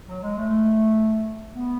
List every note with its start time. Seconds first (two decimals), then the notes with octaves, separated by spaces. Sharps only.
0.09 F#3
0.22 G#3
0.37 A3
1.54 B3